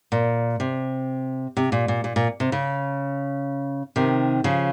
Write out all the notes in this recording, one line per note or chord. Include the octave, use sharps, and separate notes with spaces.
A#2
C3
C3
A#2
A#2
A#2
A#2
C3
C#3
C3 D#3
C#3 F3